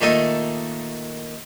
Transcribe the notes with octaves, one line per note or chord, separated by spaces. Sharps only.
A#2 D#3 A3 D#4 A4 D#6